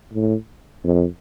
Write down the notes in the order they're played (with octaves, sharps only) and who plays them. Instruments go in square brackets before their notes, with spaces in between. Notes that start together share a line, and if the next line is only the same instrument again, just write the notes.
[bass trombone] A2
F2